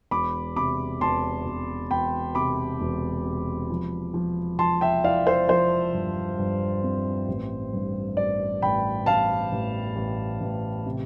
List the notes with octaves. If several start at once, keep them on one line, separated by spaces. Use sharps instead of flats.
E1 B5 D6
C3 B5 D6
E1 A5 C6
E1
E1 G5 B5
C3 B5 D6
E1
C3
F3
F3
F3 A5 C6
E5 G5
E4 D5 F5
C5 E5
F3 C5
G2
G2
C4
A1
G2
A1 D5
A1 G5 B5
A1 F5 A5
A1
A1
A1
C3